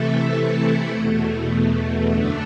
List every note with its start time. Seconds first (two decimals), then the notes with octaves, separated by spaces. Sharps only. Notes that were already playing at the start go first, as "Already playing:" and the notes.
Already playing: C3 E3 A3 E4 A4
0.89 E2 B2 A3
2.10 F#2 D3 A3 D4